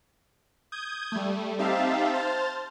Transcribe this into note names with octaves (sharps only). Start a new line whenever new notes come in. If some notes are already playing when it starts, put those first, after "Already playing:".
D#6 G6 G#6
G3 A3
C4 D#4 G4 E5 F5 A5
C5 A5 F6 A6